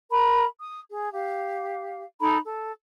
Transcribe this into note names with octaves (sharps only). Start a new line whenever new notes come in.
A#4 A#5 B5
D#6
G#4
G4 F5
D#4 A4 A#5 B5
A4